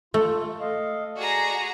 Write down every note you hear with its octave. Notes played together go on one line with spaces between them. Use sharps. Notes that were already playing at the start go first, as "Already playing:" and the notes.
A3 F4 A4
D#5 F5
F#4 G#4 D5 A#5